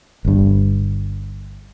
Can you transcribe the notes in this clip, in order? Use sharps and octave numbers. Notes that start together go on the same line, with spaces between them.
G1 G2